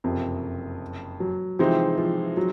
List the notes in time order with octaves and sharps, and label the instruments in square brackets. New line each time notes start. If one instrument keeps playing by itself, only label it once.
[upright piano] F#1 F2 C3
[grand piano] F#3
[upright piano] C3 E3 G#3 C4 D#4 [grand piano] F3
[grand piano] F3
F#3